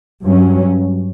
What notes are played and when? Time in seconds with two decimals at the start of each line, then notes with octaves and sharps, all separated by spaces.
0.24 G2 F#3 C#4